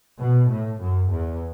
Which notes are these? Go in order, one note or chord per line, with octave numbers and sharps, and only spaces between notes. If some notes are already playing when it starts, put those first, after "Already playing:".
B2
A2
F#2
E2